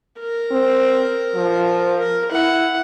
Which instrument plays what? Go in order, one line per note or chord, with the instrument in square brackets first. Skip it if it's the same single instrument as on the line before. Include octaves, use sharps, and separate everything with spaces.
[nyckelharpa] A#4
[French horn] C4
F3
[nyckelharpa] A#4
[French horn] E4 [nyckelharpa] F#5